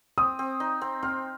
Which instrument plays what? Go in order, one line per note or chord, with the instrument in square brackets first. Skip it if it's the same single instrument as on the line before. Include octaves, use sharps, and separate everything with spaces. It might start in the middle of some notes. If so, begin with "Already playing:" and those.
[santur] C4 [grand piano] D#6
[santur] C4
D#4
C4
[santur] C4 [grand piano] F6